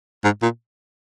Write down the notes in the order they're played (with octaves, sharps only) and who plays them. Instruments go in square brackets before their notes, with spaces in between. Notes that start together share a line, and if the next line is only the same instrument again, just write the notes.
[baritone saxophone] G#2
A#2